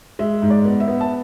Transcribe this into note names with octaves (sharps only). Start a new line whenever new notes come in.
G#3 E5
G#2
D5
B3
E5
B3
A5